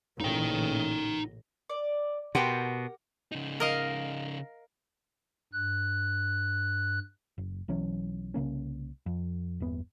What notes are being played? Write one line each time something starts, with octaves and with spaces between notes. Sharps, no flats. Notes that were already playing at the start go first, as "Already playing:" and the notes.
A1 A#2 C#3 D#4 G5
D5
B2 G4 A#4 F#5 G5 A5 C6
C#3 D#4
A#4 D#5 F5
G2 F#6
F#1
B1 E3 F#3 C#4
C2 C#3 A#3 C#4
F2
G1 E2 B3